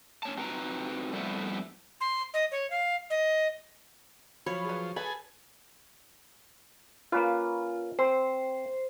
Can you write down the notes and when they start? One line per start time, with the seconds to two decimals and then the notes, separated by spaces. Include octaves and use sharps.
0.23 C#4 C#5 A5
0.38 C4 D#4 F#4 B4 G5 A#5
1.12 F2 G3 A3 B3 E4
2.01 C6
2.34 D#5
2.52 C#5
2.70 F5
3.10 D#5
4.46 F3 F#3 C#5 B5
4.65 G#4 B4
4.96 G#4 A4 B4 G#5 B5
7.12 A#3 C#4 F4 B4
7.99 C4 C5